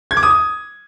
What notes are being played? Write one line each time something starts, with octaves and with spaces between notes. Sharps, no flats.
G#6
D6
D#6